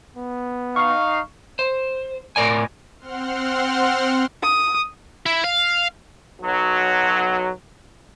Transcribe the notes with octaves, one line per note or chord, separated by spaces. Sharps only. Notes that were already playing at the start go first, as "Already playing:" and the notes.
B3
D#4 F5 C#6
C5
A2 A#4 D5 G#5
C4 F#5 C6 F6
D#6
E4
F5
B1 F#3